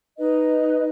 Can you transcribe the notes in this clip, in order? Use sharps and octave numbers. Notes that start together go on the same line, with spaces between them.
D#4 B4 D#5